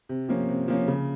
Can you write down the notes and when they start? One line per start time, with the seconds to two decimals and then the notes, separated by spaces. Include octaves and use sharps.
0.09 C3
0.29 F3 A#3 C#4
0.49 C3
0.68 F3 A#3 C#4
0.88 C#3